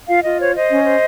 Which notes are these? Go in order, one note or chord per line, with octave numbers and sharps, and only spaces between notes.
F4 F5
F4 D#5
C5 C#5
C5 D#5
C#4
C5